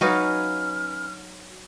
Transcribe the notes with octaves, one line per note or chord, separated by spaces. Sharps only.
F#3 C#4 D#4 F#4 B4 F5 F6